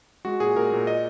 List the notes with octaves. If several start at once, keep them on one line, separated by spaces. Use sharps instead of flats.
G#3 F#4
A#2 G#4
A#2 A#4
A#2
D#5